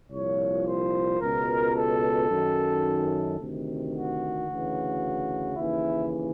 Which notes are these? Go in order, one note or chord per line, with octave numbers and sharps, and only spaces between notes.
C2 A#2 F3 C#5
C5
C#2 B2 A#4
A4
F#2 D#3
D2 C3 D#3
F#4
D2 C#3 E3
D#2 C#3 E3 E4